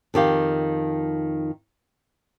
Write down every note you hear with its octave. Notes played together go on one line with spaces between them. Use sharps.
F2 D#3 G4 F5